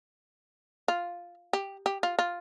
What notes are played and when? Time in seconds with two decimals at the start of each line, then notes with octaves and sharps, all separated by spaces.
0.88 F4
1.53 G4
1.86 G4
2.03 F4
2.19 F4